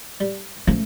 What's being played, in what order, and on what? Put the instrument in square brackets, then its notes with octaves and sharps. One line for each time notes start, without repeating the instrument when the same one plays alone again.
[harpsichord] G3
[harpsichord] C#2 F3 A#3 [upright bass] A3